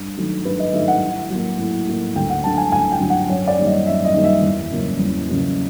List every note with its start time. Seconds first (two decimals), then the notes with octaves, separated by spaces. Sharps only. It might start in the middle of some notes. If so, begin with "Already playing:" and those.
Already playing: G2
0.17 D#3 F#3 A3
0.45 G2 B4
0.59 D#5
0.73 D#3 F#3 A3 E5
0.88 F#5
1.02 A2
1.30 F#3 A#3
1.59 A2
1.87 F#3 A#3
2.16 D2 G5
2.30 F#5
2.44 D3 F#3 A5
2.58 G#5
2.72 D2 G#5
2.92 G5
3.00 D3 F#3
3.10 F#5
3.29 F#2 C#5
3.47 D5
3.57 D#3 G3 A#3
3.66 D#5
3.85 F#2 E5
4.05 D#5
4.14 D#3 G3 A#3
4.24 E5
4.42 E2
4.71 C#3 F#3 A#3 C#4
4.99 E2
5.28 C#3 F#3 A#3 C#4